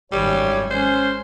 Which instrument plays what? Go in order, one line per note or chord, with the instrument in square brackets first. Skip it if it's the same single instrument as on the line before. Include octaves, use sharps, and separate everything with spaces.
[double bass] G#1 F#2 [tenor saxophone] G3 [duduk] C#5
[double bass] G#3 [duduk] C#4 [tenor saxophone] C5